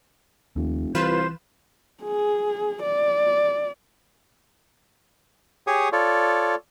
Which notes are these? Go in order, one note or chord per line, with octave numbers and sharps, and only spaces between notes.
F1 D#2
C2 E3 F4 B4 C5 E7
G#4
D5
G4 G#4 C#5 C#6 D#6
F4 A4 C#5 D5